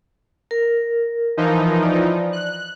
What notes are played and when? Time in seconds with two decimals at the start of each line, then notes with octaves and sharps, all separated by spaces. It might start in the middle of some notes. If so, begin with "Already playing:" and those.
0.51 A#4
1.37 E3 F3 D#4
1.83 D5
2.33 F#6